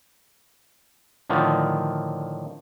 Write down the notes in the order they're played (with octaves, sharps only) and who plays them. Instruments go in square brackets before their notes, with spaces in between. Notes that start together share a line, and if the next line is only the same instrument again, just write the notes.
[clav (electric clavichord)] A2 D3 D#3 F3